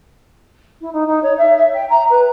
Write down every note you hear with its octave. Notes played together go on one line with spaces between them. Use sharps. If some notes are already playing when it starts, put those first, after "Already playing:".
E4
D#4
D#4
C#5
E5
E5
G5
A#5
B4